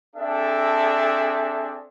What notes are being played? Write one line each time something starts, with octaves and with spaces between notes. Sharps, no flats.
C4 D4 G#4 A4 E5